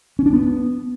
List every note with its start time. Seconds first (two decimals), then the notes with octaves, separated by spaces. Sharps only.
0.19 C#4
0.26 D4
0.33 B3